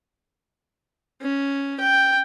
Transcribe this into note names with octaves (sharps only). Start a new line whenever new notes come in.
C#4
G5